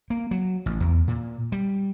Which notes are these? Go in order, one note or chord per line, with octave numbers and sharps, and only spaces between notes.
A#3
F#3
A1
E2
A#2
G3